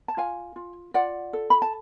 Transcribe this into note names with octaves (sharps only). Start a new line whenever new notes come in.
A5
F4 F5 G#5
F4
F4 D5 F#5
A4
B5
A5